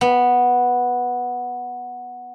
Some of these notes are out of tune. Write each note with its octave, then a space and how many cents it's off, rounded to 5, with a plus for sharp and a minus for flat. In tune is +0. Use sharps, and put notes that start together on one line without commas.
B3 -5